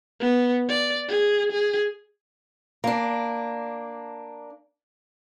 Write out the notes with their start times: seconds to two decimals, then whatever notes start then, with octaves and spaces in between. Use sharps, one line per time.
0.21 B3
0.69 D5
1.08 G#4
1.52 G#4
2.84 A#3 D4